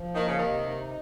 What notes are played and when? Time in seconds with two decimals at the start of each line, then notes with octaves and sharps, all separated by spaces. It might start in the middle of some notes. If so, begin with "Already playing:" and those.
Already playing: F3
0.14 D#3 A#3
0.26 C#3
0.38 D#2 C3 D#3
0.66 D#4